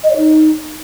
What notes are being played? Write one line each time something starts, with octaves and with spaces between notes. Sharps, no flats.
D#5
C#5
D#4